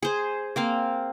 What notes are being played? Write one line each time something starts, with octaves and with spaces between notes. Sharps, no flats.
G#4 C5
A#3 C4 F5